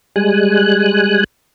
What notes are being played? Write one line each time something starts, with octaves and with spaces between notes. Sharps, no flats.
G3 G#3 G#5 F#6